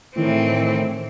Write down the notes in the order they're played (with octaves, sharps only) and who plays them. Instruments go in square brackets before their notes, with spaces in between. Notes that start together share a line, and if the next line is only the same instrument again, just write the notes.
[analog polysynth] A2 D#3 [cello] E3 C4